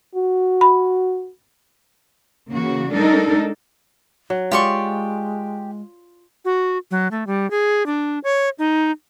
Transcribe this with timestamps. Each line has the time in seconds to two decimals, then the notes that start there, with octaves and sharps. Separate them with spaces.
0.15 F#4
0.61 B5
2.51 C#3 E3 A#3 F#4
2.92 G3 G#3 D4 D#4 A4 A#4
4.30 F#3
4.51 G#3 F4 G4 D5 C6 C#6
6.45 F#4
6.91 F#3
7.11 A3
7.27 G3
7.51 G#4
7.86 D4
8.24 C#5
8.59 D#4